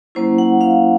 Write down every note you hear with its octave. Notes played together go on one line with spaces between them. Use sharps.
F#3 A#3 C#4 E4 C5
F#5
F5